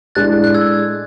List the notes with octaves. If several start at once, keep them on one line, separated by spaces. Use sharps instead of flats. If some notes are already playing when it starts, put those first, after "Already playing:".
A2 G#3 D4 F#6 A6
F#6
E6 G#6